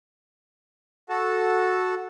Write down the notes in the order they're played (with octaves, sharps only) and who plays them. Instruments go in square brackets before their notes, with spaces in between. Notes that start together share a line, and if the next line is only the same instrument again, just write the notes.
[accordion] F#4 A4